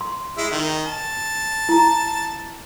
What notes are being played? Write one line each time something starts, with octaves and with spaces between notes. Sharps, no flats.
C6
G#3 E4
D#3
A5
E4 A#5